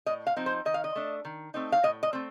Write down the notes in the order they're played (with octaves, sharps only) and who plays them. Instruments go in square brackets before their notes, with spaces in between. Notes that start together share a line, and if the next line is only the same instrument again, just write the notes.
[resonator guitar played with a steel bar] A2 D#5
F5
F3 C4 D#4
C5
D#3 D#5
F5
D#5
A3 D4
D#3
A3 C4 D#4
F5
A2 D#5
D#5
A3 C4